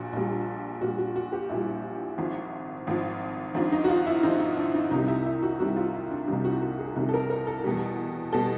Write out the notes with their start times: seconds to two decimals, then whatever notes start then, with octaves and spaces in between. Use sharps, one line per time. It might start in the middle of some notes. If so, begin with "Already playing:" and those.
Already playing: A#1 A#2 F#4
0.13 A#1 A#2 G3
0.81 A#1 A#2 G3 F#4
0.98 F#4
1.16 F#4
1.32 G4
1.49 A#1 A#2 G3 E4
2.18 G#1 G#2 F3
2.87 G#1 G#2 F3
3.54 G#1 G#2 F3 D4
3.72 D#4
3.84 F#4
3.88 F4
4.06 E4
4.23 G#1 G#2 F3 D#4
4.40 D#4
4.57 D4
4.74 D#4
4.91 C2 C3 D#3 G3 D#4
5.08 E4
5.26 E4
5.42 F#4
5.60 C2 C3 D#3 G3 F#4
5.76 F4
5.94 E4
6.11 D4
6.28 C2 C3 D#3 G3 D#4
6.44 F#4
6.61 F#4
6.79 G#4
6.96 C2 C3 D#3 G3
7.09 A4
7.14 A#4
7.30 A#4
7.47 A4
7.64 E2 B2 G3
8.33 B2 G3 A4